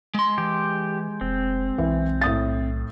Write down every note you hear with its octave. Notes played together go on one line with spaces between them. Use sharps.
G#3 C6
E3 G4
F1 C4
B1 E3
A2 D#6 A6